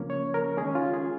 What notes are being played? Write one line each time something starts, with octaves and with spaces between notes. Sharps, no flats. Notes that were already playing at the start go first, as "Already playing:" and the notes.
Already playing: C#3 F3 A#3 C#4
C#5
A#4
D#3 G#3 C#4 G#4
F4
G#4